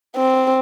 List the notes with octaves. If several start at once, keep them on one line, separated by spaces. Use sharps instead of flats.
C4